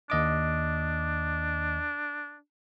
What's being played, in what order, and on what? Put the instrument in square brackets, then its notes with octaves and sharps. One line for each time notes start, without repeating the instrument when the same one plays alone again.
[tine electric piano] D#2 D#5 D6 [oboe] D4